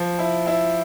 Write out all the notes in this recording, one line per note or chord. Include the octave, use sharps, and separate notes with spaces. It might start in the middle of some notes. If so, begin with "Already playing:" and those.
Already playing: F3
E4
E4